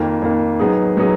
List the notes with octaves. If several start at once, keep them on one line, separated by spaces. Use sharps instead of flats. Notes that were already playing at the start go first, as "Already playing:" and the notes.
Already playing: F2 D#3 A#3
F2 D#3 A#3
F#3 B3 D#4 G#4
F#3 B3 D#4 G#4